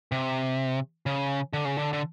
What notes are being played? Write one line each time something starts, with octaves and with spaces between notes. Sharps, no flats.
C3
C#3
D3
C#3
D3
D3